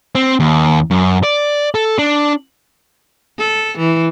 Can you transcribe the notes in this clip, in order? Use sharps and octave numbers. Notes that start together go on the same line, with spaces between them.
C4
D#2
F#2
D5
A4
D4
A4
E3